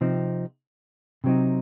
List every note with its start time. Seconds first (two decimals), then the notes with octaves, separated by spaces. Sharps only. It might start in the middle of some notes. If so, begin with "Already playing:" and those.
0.01 C3 F3 C4 D#4
1.24 C3 F#3 C4 D#4